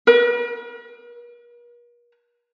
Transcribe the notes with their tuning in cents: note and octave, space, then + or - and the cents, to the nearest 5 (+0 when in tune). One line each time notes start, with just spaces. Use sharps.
A#4 +45